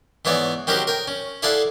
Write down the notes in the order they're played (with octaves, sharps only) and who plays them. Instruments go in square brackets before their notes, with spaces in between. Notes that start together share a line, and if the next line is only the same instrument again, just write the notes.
[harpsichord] G#2 E3 B3 C#5 D5
D#3 C4 C#4 F#4 G4 A#4
A#4 G5
C#4
E4 G#4 A4 D5 F5 F#5